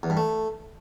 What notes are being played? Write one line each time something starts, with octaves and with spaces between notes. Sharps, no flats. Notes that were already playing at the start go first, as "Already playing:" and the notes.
E2
G2
A3